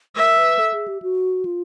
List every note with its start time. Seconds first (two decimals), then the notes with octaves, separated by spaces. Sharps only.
0.16 A#4 E5
0.38 B4
0.59 A4
0.73 G#4
0.88 G4
1.02 F#4
1.45 F4